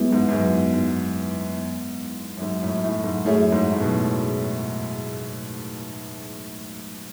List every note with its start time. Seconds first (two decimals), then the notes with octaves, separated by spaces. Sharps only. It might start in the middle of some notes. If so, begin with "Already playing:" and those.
Already playing: F#2 G#3 B3 E4 B4
0.12 G#2
0.28 F#2
0.33 G#2
0.74 G#2
2.37 F#2
2.42 G#2
2.63 F#2 A2
2.83 F#2 A2
3.04 G#2
3.25 F#2 A3 E4 G#4 C#5
3.52 G#2
3.71 A2
3.80 G#2 B2